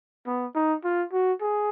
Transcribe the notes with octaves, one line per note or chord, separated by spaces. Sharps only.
B3
D#4
F4
F#4
G#4